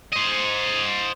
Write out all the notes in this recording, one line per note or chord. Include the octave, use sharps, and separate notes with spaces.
C5 D#5